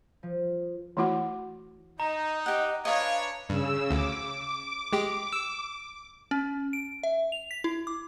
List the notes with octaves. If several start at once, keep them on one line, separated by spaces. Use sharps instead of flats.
F3
E3 A3 E4 F#4 F#5
D#4 D#5 A#5
G4 D#5 F#5
D4 B4 C#5 D#5 F5 A#5
G2 C#3 E6
D2 D6
G#3 G4
E6
C#4
D7
E5
F7
B6
E4
D6